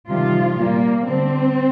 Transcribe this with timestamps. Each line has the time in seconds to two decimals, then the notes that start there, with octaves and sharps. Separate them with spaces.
0.08 C3 D#3 F3 G3 F4
0.57 A#2 G3 A#3
1.06 D3 G3 C4